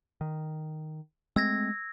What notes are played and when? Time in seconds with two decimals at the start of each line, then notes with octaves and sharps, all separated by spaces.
0.21 D#3
1.36 G#3 A3 C4 E6 G#6 A#6